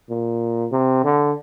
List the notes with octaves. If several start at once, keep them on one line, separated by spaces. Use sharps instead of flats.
A#2
C3
D3